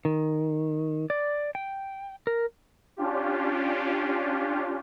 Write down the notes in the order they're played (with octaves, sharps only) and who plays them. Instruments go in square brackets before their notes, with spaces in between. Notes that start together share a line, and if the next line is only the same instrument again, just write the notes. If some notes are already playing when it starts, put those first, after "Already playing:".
[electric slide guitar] D#3
D5
G5
A#4
[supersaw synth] C#4 D4 F4 G4